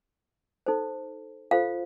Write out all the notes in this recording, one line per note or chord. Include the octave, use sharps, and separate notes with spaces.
D#4 A4 C5
F4 A4 C5 F5